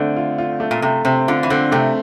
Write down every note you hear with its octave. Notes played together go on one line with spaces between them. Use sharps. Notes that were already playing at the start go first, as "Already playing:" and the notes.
Already playing: D3 A3 C4
F4
F4
A3
A#2
C3 A3
C3 C4
D3 F4
E3
D3 C4
C3 A3